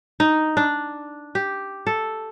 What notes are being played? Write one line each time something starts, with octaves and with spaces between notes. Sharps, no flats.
D#4
D4
G4
A4